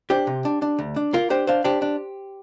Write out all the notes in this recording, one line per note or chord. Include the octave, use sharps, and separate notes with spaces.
D4 G4 C5
C3
D4
D4
D2
D4
A#3 F4 A#4
D4 G4 C5
D4 C5 F5
D4 G4 C5
D4